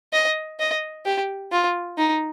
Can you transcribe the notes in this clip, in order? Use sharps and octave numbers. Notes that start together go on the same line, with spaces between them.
D#5
D#5
G4
F4
D#4